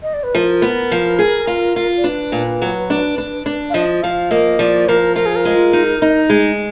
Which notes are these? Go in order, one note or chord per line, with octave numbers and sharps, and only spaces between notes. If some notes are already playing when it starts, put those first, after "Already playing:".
D#5
D5
B4
F3 A#4
B3
F3
G#4
F4
F4
D5
D4 B4
A#2
F#3
D4
D4
D4
F5
F3 D#5
F3 F5
A#3 D#5
F3 D5
F3 A#4
F4 A#4
G#4
A#4
G#3
D#4
D#4
G#3